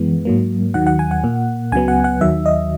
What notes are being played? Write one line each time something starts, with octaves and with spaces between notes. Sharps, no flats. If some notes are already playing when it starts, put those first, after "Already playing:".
Already playing: F#2 E3 G#3 B3
G#2 F#3 A#3
D#2 D#3 F#3 F#5
F#5
G#5
F#5
A#2 A#3
C#2 C#3 F#3 B3 G#5
F#5
F#5
D#2 D#3 F#3 E5
D#5